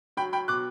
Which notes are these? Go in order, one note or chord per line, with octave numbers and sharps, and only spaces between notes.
F#3 G5 B5
G5 B5
B2 D6 F#6